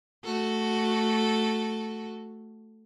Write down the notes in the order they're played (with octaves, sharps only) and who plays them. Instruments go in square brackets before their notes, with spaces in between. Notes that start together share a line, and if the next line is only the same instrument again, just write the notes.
[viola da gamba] A3 F#4 A4